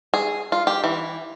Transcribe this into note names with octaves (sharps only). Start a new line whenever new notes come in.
G#4
F4
G4
E3